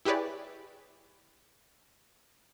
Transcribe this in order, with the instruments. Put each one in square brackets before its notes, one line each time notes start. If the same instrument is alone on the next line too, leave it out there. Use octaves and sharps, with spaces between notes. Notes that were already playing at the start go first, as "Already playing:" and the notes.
[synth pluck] E4 G4 G#4 B4 C#5 D5